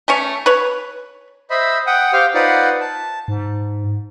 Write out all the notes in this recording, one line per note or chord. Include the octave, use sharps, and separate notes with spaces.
A3 C#4 C#5
B4 C#5
C5 D#5 E5 B5
F#5 G5 D#6
G4 C5 F5 G5
D#4 F4 B4 C5 D5 F#5
A5
G#2